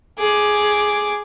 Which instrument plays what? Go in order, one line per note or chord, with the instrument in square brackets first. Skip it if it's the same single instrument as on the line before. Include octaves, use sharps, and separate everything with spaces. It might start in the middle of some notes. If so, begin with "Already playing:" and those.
[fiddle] G#4 D6